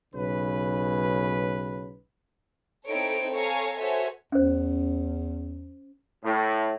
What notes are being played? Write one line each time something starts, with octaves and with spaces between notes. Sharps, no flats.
B1 C#3 B4
C4 D#4 E4 A4 C#5 D7
A4 C#5 F5 G#5 A#5 C#6
F#4 A4 C5 C#5 E5 G#5
E2 C#4 C5
A2